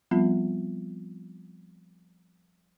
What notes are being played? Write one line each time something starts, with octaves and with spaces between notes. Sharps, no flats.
F3 G3 B3 C4 F4